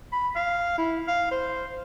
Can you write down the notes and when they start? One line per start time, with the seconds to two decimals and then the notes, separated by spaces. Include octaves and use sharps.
0.12 B5
0.35 F5
0.78 E4
1.08 F5
1.31 C5